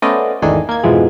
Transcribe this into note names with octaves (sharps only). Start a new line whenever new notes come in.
A3 B3 C#4 C5 D5 D#5
G#1 E2 D#3 A3 D4 G#4
A#3 G#6
F2 G#2 B2 E3 F3 G#3